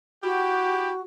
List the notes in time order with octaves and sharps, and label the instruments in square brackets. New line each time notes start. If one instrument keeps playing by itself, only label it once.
[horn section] E4 G4 [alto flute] F#4